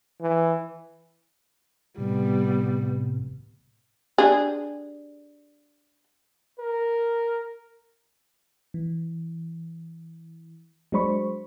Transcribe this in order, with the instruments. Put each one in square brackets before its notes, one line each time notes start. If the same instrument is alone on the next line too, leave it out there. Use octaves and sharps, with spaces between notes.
[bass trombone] E3
[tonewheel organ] A2 C3 [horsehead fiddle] G3 B3
[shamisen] D4 G4 G#4
[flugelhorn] A#4
[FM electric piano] E3
F#3 G#3 D4 C5 B5 C#6